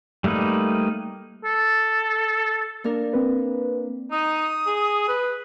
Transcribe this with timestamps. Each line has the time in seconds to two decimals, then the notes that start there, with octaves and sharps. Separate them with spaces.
0.24 G3 A3 A#3 D#4 B4
1.45 A4
2.84 A#3 D4 A#4
3.13 C4 B4
4.11 D#4 D#6
4.67 G#4
5.08 B4